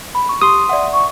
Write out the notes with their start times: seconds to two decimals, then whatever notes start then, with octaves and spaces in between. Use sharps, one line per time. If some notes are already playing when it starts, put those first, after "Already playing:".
0.15 B5
0.29 C#6
0.42 G4 C6 D#6
0.69 D5 E5 F#5
0.93 C#6